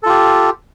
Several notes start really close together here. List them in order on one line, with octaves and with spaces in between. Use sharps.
A4 F4 G4